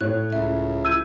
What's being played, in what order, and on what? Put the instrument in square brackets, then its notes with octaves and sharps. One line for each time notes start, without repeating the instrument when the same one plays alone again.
[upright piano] A2 C#5 [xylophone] F#6
[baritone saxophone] C#2 [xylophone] E5
[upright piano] E4 G6 G#6 [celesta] E6 D#7